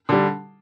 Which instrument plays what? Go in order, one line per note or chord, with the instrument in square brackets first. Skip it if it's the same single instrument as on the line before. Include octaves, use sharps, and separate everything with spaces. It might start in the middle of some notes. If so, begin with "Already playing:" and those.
[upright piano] D3 G3